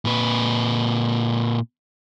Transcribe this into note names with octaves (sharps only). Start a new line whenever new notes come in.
A#2 B4